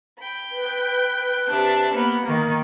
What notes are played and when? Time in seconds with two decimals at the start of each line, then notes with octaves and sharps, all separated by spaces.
0.20 G5 B5
0.51 B4
1.48 C3 D4 E5
1.93 A#3 B3
2.24 D#3 A#3